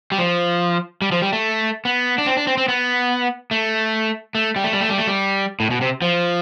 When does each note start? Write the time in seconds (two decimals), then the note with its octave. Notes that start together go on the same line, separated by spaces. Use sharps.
0.12 G3
0.18 F3
1.02 G3
1.12 F3
1.22 G3
1.33 A3
1.85 B3
2.18 D4
2.26 C4
2.37 D4
2.47 C4
2.58 C4
2.68 B3
3.51 A3
4.35 A3
4.56 G3
4.64 A3
4.73 G3
4.81 A3
4.89 G3
4.98 A3
5.07 G3
5.60 A2
5.71 B2
5.81 C3
6.02 F3